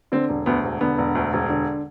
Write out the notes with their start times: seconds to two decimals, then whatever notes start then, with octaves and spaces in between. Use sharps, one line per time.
0.12 D3 C4
0.29 E1
0.46 D2 B3
0.64 E1
0.81 D3 B3
0.98 E1
1.15 D2
1.33 E1
1.50 D3